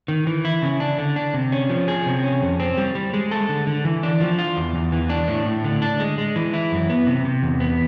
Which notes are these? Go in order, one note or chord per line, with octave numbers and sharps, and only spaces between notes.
D#3
E3
E4
C#3
D4
D3
D4
C3
C#4
F3
G#4
C3
C#4
F2
C4
G3
G3
G#3
A4
D3
D3
E3
D4
F3
F4
E2
E2
E3
D4
A2
A2
D3
D4
G#3
G#3
E3
E4
F#2
B3
C3
C3
E2
B3